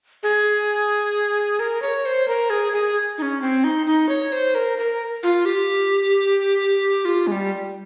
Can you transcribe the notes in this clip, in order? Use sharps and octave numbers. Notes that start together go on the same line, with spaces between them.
G#4
A#4
C#5
C5
A#4
G#4
G#4
D#4
C#4
C4
D#4
D#4
C#5
C5
A#4
A#4
F4
G4
F4
G#3
G3